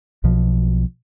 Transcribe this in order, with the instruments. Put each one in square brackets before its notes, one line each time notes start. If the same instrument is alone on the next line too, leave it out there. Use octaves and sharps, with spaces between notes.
[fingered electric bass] B1 B2 F3